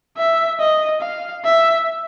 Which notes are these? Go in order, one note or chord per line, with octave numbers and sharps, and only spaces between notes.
E5
D#5
F5
E5